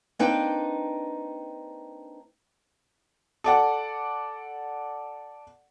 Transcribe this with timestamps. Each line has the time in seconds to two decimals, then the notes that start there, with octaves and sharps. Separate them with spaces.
0.19 A#3 C4 D4 D#4 B4 G5
3.44 A4 D5 F#5